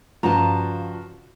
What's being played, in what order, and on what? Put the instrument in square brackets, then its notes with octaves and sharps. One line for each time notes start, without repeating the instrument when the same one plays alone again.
[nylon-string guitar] G2 F4 A5 [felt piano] C#3 F#4 [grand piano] F3 [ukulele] A#5